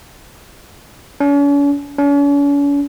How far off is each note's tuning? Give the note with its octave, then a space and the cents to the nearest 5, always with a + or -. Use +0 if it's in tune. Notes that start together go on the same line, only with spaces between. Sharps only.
C#4 +45
C#4 +45